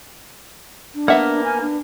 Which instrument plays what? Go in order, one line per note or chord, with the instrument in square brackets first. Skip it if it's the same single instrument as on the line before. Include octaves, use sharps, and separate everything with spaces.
[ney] D4
[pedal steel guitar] A#3 [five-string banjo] B3 E5 F#5
[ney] G#5
D4